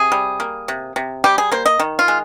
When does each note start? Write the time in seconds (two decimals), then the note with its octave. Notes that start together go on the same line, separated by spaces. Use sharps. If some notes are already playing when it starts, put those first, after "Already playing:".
Already playing: C3 G#4
0.12 G3
0.40 A#3
0.68 C3
0.96 C3
1.24 G3 G4
1.38 G#4
1.52 A#3 C5
1.66 D#5
1.80 D#3
1.99 F4
2.08 G#3